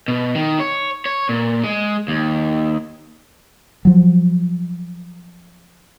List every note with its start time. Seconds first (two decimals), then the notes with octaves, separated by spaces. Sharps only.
0.08 B2
0.35 D#3
0.60 C#5
1.06 C#5
1.29 A#2
1.64 G#3
2.08 D#2
3.85 F3 F#3